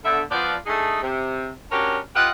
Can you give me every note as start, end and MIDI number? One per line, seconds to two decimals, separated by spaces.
0.04 0.22 50
0.04 0.22 59
0.04 0.22 76
0.31 0.55 53
0.31 0.55 59
0.31 0.55 74
0.66 0.99 57
0.66 0.99 62
0.66 0.99 63
0.66 0.99 68
1.02 1.52 48
1.72 1.98 61
1.72 1.98 62
1.72 1.98 66
1.72 1.98 67
1.72 1.98 70
1.72 1.98 73
2.16 2.29 65
2.16 2.29 67
2.16 2.29 71
2.16 2.29 75
2.16 2.29 77
2.16 2.29 78